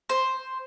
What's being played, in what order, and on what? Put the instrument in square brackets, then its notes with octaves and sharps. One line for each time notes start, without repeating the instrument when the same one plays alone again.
[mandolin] C5